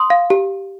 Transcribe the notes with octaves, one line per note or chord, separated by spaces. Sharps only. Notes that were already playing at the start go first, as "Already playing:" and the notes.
Already playing: C6 D#6
F5
G4